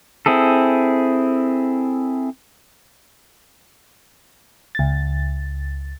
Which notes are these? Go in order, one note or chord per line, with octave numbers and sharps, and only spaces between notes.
C4 E4 G#4 A4
C#2 A6